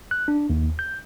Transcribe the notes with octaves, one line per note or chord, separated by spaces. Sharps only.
F#6
D4
D#2
G6